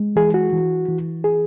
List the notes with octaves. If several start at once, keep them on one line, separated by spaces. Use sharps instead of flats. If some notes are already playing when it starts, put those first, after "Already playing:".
Already playing: G#3
E3 G#4
F#4
E3
E3
G#4